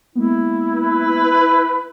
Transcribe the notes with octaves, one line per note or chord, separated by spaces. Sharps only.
G#3 A#3 B3 E4
B4